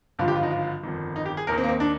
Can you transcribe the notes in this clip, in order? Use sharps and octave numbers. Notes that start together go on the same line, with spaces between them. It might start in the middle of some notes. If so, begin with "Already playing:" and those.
G#1 G2 D3 F3 F4
G4
F4
D#4
F4
G1 F2 D#3
D#4
G4
G#4
D#2 D#3 A#4
C4
A#3
C4
D4